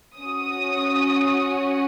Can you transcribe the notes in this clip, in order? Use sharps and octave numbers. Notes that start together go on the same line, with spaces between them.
C#4 F#4 D#6